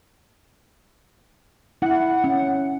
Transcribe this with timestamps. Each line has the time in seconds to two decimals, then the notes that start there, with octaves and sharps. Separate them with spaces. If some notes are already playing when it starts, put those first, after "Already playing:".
1.82 E4 F#5
2.24 C#4